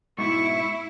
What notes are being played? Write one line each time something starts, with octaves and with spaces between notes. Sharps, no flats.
G#2 B2 E4 C#6